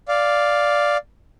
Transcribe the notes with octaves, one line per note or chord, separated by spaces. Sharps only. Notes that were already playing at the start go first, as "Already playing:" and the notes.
D5 F5